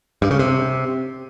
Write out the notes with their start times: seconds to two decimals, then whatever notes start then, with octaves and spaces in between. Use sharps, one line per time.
0.22 G2
0.31 C#3
0.39 C3